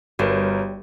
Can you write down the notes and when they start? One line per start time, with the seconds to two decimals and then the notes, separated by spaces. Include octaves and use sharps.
0.19 G1 G3 F#4 A#4 B4 C#5